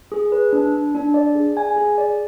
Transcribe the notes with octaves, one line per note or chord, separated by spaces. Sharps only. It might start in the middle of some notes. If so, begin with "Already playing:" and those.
G#4
B4
D4
D4
D4
D5
G#4
G#5
G#4
D5